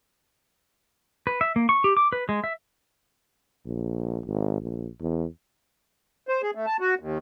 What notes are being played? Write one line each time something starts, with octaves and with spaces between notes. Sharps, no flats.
B4
E5
A#3
C#6
G4
D6
B4
G#3
E5
A#1
G#1
A#1
E2
C5
G#4
A3
A5
F#4
D#2